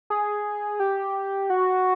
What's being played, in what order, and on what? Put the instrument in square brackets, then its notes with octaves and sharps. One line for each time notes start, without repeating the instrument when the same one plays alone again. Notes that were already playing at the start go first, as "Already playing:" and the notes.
[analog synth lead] G#4
G4
F#4